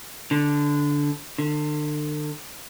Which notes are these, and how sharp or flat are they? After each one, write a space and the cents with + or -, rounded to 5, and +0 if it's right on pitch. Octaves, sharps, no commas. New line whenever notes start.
D3 -10
D3 +35